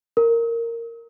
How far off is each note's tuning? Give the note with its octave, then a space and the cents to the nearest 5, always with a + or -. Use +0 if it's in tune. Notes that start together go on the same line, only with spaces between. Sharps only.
A#4 -10